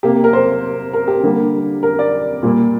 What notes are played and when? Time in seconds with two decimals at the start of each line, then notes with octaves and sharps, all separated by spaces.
0.03 C3 A#3 G4
0.24 A#4
0.33 C5
0.93 A#4
1.08 G4
1.23 D3 G3 A#3
1.83 A#4
1.99 D5
2.43 A#2 G3 A#3